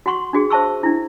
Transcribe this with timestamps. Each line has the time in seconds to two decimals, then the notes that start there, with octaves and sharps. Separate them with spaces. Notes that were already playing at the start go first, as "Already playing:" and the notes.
0.06 F#4 F#5 C6 C#6
0.33 D4 F#4 G#4
0.50 C5 E5 A5 C#6 E6
0.83 D4 E4